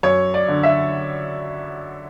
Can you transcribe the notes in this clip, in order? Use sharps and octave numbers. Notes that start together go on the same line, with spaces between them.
F#2 C#5
D5
D3
E5